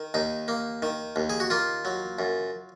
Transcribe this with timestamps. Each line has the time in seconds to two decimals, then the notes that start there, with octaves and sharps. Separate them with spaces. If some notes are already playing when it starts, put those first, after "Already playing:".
Already playing: D#3
0.14 D#2 D#4
0.48 A#3
0.82 D#3
1.16 D#2
1.30 G#4
1.40 F#4
1.50 A#3 F4
1.85 F#3
2.19 F#2